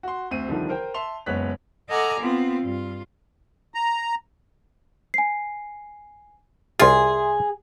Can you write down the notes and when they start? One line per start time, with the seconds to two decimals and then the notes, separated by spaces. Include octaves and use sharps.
0.03 F#4 C6
0.31 D2 C4 D#7
0.48 C2 D3 D#3 F3
0.69 A#4 C5 G5
0.94 E5 A5 C6 F7
1.26 F#1 G#3 B3 C#5 F#6 B6
1.88 A4 D#5 F#5 G#5 A#5 D6
2.18 B3 C4 F4
2.62 G2 F4
3.74 A#5
5.14 G#5 C7
6.80 C2 F4 G#4 E5 G#5 C6